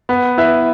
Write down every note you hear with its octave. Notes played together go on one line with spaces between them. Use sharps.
B3
E4 B4 E5